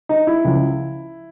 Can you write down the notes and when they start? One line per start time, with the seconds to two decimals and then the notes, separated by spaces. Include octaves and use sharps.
0.09 D#4
0.27 E4
0.44 C#2 C#3 F3